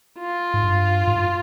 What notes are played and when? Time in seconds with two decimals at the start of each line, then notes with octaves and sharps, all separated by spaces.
0.19 F4
0.54 G#2
0.63 G2
1.07 G#2
1.16 G2